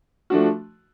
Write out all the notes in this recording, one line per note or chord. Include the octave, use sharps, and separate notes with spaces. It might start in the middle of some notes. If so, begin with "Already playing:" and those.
F3 A3 D4 F#4